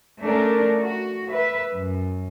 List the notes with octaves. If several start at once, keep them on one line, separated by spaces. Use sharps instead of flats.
A3 C#4 D4 A#4
F#4
B4 E5
F#2